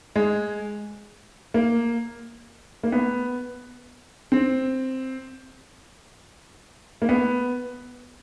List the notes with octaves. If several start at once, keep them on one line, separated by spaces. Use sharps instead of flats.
G#3
A#3
A#3
B3
C4
A#3
B3